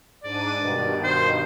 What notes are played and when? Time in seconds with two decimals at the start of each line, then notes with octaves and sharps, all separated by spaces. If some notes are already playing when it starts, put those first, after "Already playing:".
0.24 G#2 D4 D5 D#7
0.60 G2 B2 D#3
1.04 C5